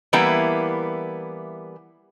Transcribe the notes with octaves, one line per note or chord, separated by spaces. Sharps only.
E3 G3 A#3 B3 E4